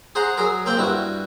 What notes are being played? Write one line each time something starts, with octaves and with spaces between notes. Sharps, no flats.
G#4 C5 F#5 A#5
F#3 G#4 A#4
A#3 C4 G5
G2 E4 F#4